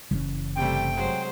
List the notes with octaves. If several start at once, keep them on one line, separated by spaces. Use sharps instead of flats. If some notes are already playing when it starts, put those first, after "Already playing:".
F#1 C#3 E3 C#4
C3 G3 A3 G5
F#3 G#3 C5